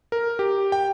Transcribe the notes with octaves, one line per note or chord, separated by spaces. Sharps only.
A#4
G4
G5